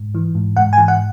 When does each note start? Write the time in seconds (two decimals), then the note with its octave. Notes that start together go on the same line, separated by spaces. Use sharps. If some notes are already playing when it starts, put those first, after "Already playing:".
Already playing: G#2
0.15 E3
0.35 G#2
0.56 G#2 F#5
0.73 G#5
0.78 E3
0.88 F#5